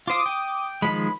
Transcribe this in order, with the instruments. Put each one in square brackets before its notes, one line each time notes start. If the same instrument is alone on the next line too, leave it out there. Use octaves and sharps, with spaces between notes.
[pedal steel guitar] F4 C5 [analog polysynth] D6 D#6
[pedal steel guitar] G5
[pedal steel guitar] D#3 F3 G#3 [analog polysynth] B5